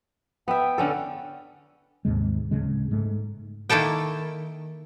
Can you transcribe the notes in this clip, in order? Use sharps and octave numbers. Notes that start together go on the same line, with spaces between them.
B3 E5 G5
D3 C#4 A4
D#2 G#2 C3 G#3
D1 A#1 C#3 G#3
G#2 A3
D#3 A#3 E4 A4 G5